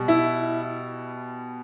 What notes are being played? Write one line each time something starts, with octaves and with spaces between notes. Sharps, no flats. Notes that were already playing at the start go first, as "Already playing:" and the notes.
Already playing: B2 G3
E4